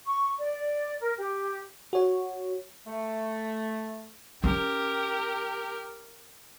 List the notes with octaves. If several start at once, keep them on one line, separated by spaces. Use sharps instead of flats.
C#6
D5
A#4
G4
F#4 C#5
A3
C#4 G4 A#4